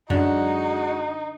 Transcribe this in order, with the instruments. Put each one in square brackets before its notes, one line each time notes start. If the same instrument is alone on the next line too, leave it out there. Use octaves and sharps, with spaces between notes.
[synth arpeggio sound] F#2 [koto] D3 [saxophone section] G#3 F#4 [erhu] D#4